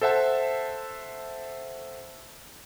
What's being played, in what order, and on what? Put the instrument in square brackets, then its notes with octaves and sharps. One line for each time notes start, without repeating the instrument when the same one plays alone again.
[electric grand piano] A4 C5 E5 F#5 A5